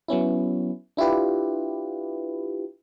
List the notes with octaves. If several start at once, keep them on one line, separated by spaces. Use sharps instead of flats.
F#3 B3 C#4 E4
D4 E4 F4 G4 B4